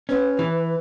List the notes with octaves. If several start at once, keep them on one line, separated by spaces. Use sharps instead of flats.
C#4 B4
E3